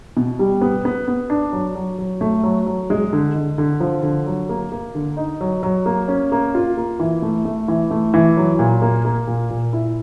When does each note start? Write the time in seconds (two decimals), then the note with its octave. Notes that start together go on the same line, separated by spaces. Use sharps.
0.17 B2
0.39 G3
0.61 B3
0.85 B3
1.08 B3
1.30 D4
1.53 F#3
1.75 F#3
1.99 F#3
2.21 A3
2.44 F#3
2.66 F#3
2.90 G#3
3.13 D3
3.36 D3
3.58 D3
3.80 F3
4.03 D3
4.26 F#3
4.49 A#3
4.72 A#3
4.95 D3
5.17 D#4
5.41 F#3
5.63 F#3
5.86 A#3
6.08 C#4
6.32 A#3
6.55 F4
6.77 A#3
6.99 E3
7.22 A3
7.45 A3
7.68 E3
7.91 A3
8.14 E3
8.37 F#3
8.59 A#2
8.82 A#3
9.05 A#3
9.28 A#2
9.50 A#2
9.73 E4